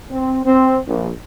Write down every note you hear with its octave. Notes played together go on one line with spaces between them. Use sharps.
C4
C4
A#1